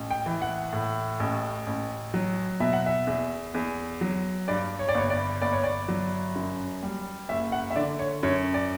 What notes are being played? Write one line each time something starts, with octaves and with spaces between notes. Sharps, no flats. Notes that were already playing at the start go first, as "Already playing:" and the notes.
Already playing: A1
G5
E3
F#5
A2
A1
A1
F#3
B2 E5
F#5
E5
E2
E2
F#3
G2 D5
C#5
D5
G1 C#5
D5
G1 D5
C#5
D5
F#3
F#2
G3
F#1 E5
F#5
E5
D3 D5
C#5
F#2 C#5
D5